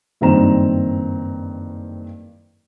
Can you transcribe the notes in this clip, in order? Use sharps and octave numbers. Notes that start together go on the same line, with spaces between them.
F#1 G2 D#3 C4 A#5 E7